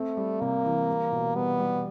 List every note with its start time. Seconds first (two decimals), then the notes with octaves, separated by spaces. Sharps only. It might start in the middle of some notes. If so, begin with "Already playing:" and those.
Already playing: A3 C4
0.17 G3
0.41 C3 A#3
0.65 E3
0.88 G3
1.12 B2
1.35 G3 B3
1.59 G3